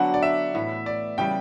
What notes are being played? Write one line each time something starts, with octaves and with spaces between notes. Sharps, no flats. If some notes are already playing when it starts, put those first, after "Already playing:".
Already playing: D3 F#3 B3 D4 F#5
D5
E5
A2 E3 B3
D5
C#3 E3 G3 G5